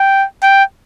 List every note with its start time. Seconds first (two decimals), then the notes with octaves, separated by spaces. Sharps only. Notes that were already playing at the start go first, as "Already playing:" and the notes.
Already playing: G5
0.43 G5